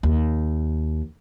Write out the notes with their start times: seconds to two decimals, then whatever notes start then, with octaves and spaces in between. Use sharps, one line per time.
0.03 D#2